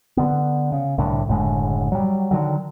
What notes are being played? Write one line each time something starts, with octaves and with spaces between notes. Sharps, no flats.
D3 B3
C#3
C2 A2 D3
F#1 A2 D3 G#3
F#3 G3
D3 D#3 F#3